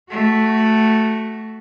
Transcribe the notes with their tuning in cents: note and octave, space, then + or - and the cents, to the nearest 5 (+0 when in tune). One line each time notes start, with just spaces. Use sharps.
A3 +0 F#4 +10